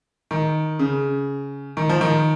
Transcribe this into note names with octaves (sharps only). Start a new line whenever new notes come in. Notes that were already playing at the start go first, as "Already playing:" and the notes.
D#3
C#3
D#3
F3
D#3